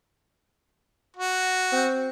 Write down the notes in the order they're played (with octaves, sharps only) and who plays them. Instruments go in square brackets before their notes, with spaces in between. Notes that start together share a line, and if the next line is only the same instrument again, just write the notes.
[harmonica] F#4
[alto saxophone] C4